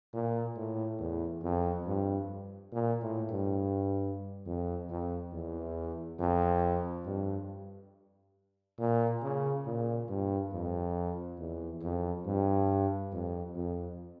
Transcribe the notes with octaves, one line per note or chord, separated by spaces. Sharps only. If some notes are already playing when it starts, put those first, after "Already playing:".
A#2
A2
E2
F2
G2
A#2
A2
G2
F2
F2
E2
F2
G2
A#2
C#3
A#2
G2
F2
E2
F2
G2
F2
F2